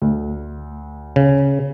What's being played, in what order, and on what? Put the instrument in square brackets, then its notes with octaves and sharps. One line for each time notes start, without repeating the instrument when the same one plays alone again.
[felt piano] D2
[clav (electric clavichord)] C#3